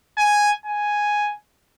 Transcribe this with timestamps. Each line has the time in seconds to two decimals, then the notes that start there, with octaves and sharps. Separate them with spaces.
0.18 G#5
0.66 G#5